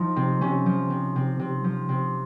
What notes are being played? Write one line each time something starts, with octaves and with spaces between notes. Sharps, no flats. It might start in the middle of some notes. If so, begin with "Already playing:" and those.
Already playing: F3 D#4
C3
C3 C#4
F3
C3
C3
C3
F3
C3